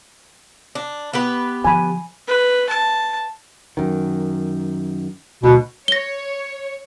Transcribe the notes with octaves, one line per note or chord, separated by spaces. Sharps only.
D4
B3 G4 B4
D3 F3 G#5 B5
B4
A5
F#2 D#3
D1 D2 B2
C#5 A#6 G7